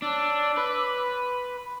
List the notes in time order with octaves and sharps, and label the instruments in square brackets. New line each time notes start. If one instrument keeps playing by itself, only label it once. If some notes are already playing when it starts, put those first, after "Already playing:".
[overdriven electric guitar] D4 [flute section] C#5 D6 E6
[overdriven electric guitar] B4
[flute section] C6